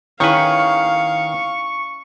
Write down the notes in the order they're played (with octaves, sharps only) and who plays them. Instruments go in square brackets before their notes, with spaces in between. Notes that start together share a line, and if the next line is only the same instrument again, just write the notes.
[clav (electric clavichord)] D#3 B4 [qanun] C#4 E4 G#4 [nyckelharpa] F5 [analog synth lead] C#6